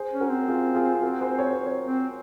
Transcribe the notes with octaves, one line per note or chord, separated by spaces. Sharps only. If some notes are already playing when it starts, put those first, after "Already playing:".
Already playing: G#4 C5
C#4
F#4 A#4
C4
F4 G#4
F4 G#4
C4 F#4 A#4
G#4 C5
C#5
C5
A#4 C#5
C4